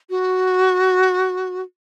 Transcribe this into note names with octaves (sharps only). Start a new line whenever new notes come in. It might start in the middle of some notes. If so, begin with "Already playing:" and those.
F#4